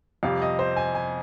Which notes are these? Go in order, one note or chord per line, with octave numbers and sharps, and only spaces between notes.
F2 C3 G3 F5
D#5
C5
G#5
G#5